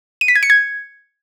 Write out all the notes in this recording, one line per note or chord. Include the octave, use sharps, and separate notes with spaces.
D#7
B6
G#6
C#7
G#6